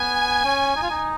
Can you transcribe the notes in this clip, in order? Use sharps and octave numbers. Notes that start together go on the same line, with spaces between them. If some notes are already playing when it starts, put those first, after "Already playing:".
Already playing: B3 G#5
C#4
D#4
F4
D#4